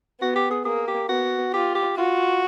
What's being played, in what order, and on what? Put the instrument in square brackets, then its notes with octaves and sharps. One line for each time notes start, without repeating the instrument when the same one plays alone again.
[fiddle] B3 [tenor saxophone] F#4
[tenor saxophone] G4
G#4
[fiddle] A#3 [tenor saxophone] G#4
[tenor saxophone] G4
[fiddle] B3 [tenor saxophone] F#4
[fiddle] F4 [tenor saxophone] G4
[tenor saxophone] G4
[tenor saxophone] F4 [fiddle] F#4